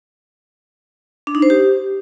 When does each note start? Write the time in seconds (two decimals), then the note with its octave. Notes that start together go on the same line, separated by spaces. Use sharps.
1.27 D4
1.35 D#4
1.42 C5
1.50 G4